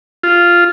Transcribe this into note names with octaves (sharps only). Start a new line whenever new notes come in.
F4